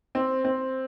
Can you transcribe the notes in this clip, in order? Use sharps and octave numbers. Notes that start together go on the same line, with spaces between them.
C4
C4